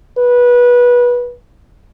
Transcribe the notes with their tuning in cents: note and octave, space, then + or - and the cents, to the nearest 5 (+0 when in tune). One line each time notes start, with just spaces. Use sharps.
B4 -20